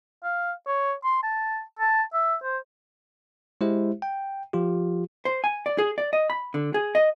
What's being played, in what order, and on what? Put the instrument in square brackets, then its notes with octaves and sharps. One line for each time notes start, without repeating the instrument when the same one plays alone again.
[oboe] F5
C#5
C6
A5
A5
E5
C5
[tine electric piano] G#3 E4 G4 C5 E5
G5
F3 F4 G4
[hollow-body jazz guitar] C5
G#5
D5
G#4
D5
D#5
B5
D3
G#4
D#5